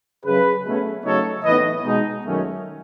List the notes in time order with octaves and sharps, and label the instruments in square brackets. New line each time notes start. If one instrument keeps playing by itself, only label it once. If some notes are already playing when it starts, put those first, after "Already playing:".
[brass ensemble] F#2 C#3 F#3 G#4 B4
B2 A3 C#4
C#3 F#3 A3 D#4 A4 C#5
A2 E3 B3 D#4 B4 D#5
B2 G#3 D#4
F#2 D#3 F#3 A3 C#4